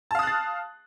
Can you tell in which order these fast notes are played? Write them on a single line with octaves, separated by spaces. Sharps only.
A5 F5 D#6 F#6 A6